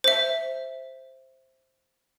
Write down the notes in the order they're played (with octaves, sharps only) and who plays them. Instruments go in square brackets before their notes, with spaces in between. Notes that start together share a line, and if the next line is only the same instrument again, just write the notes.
[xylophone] C5 E5